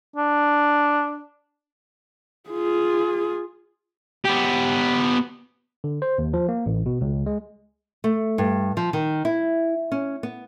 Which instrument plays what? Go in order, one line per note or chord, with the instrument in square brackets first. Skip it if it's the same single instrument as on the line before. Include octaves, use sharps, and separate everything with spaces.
[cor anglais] D4
[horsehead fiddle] F4 G#4
[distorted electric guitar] B3 G4
[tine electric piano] D3
C5
D#2
F3
A#3
A1
B2
C#2
G#3
[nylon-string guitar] A3
G2
F3
D#3
E4
C#4
B3